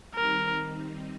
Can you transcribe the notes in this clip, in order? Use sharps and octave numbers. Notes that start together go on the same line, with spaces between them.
D#3 G3 C4 D#4 A#4